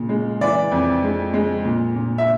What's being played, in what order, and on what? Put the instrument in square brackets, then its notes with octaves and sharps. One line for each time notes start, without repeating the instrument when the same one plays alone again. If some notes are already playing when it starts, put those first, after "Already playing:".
Already playing: [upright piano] A#2 C#3
G#3
E3 D5
F2
G#3
G#3
A#2
A#2
E5